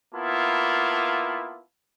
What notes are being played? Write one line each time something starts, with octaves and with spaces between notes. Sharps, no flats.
A#3 B3 E4 F4 A5